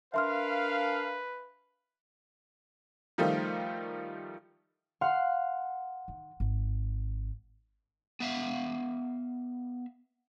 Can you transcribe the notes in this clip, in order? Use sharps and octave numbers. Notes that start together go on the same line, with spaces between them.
D4 A#4 B4 E5 F5 C6 F6
D#3 F3 G3 A3 D#4 F4
F5 F#5 C6
D#3
G#1
B3 E5 F5